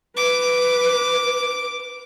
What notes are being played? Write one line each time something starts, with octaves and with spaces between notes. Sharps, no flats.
B4 D6